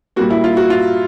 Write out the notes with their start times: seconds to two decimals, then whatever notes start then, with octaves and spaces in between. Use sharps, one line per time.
0.16 A#2 G3 A#3 F#4
0.30 E4
0.44 F4
0.57 F#4
0.70 F4